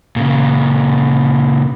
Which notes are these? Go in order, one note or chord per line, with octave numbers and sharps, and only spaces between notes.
A#2 C#3